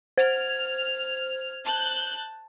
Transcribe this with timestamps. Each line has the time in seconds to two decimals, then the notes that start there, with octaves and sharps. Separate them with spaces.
0.18 C5 F6 G#6
1.65 A5 F#6 G6